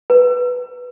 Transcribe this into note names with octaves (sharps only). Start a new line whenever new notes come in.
B4